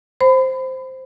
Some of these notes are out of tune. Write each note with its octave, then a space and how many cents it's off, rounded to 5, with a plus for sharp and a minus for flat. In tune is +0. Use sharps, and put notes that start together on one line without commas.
C5 +0 B5 +30